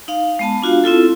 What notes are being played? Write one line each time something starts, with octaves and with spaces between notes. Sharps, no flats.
D#4 F5
G#3 B3 A5
D4 F4 F#4 F5
C4 E4 F4 A4